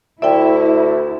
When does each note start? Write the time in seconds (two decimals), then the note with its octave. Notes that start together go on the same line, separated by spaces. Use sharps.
0.22 D2 E4 D5 E5 G5